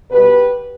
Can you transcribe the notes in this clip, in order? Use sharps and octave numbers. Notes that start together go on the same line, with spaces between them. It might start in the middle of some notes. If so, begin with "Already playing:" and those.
B2 G3 G4 B4